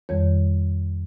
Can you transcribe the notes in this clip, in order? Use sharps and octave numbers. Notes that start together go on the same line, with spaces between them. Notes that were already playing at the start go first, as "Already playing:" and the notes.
F2 D#3 G3 C#5